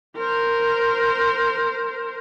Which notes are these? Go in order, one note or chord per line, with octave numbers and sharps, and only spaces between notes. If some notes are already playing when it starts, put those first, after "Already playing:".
A#4 C5